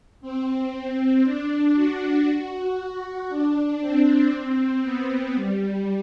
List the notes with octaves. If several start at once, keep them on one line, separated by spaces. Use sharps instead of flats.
C4
D4
F#4
D4
C4
B3
G3